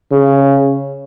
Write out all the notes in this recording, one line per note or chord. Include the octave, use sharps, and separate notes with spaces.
C#3